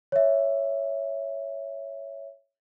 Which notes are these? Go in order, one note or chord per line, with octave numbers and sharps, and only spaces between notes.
C#5 E5